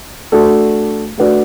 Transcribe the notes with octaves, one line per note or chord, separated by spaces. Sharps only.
A3 D4 F#4 A4
A3 D4 F#4 B4 D5